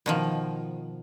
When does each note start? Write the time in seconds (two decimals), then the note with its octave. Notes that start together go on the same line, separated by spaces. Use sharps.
0.06 B2 D#3 F3